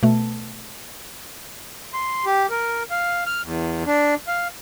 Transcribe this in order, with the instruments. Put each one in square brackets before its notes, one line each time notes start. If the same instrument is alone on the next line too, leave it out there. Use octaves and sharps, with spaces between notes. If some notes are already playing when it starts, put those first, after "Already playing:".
[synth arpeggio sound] B2 A3
[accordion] C6
G4
A#4
F5
F6
E2
D4
F5